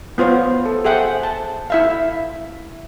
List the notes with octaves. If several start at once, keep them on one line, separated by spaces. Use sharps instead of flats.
B3 F4 C5 C#5
A4
G#4 C5 E5 F#5 G5
A5
E4 E5 F5